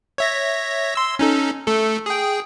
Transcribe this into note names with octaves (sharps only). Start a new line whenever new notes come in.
C#5 E5 A#6
C6 E6
C#4 D#4 A4
A3 A4
G#4 G5